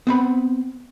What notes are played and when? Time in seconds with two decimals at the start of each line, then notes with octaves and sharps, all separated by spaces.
0.07 B3 C4 B5